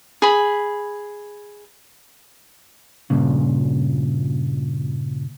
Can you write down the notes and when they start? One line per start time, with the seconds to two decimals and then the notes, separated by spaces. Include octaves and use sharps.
0.22 G#4 B5
3.10 G2 A#2 C#3